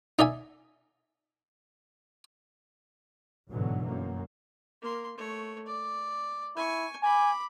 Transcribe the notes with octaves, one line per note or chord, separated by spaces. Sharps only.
D#4 D5 E5 G#5
G1 G#2 B2 D3 E3 F#3
F#2 A#3
A#3 C6
A3 C#5
D5
E4 G#5 C#6
G#5 B5 D6